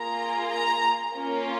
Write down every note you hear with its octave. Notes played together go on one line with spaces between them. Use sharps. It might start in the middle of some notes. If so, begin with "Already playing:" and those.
Already playing: A#3 F4 G#4 A#5
A#5
A#3 C#4 F4